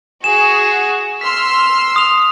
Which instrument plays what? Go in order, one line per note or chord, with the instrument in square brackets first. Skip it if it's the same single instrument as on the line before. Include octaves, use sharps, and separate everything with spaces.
[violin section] F#4 G#4 [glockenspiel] E7
[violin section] C6 E6 F6 [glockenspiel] B6
[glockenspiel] D#6 F7